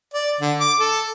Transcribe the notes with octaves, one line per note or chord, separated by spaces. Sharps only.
D5
D3
D6
A4